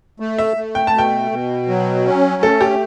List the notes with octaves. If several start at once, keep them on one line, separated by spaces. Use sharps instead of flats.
A3
E5
A3
G5
A5
B2 G5
B2
F#3
C#4
A3 A4
G4